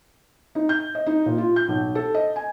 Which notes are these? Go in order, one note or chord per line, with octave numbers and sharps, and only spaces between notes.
D#4
G6
D#5
D#4
A#2
F4
G6
B1
A4
D#5
G#5